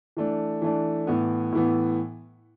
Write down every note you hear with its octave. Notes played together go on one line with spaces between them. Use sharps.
E3 A3 D4
E3 A3 D4
A2 E3 B3
A2 E3 B3